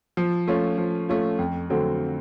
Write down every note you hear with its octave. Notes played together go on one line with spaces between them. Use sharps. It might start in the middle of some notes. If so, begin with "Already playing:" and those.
F3
A3 C#4 F4
F3
A3 C#4 F4
F2
D3 F#3 A3 C4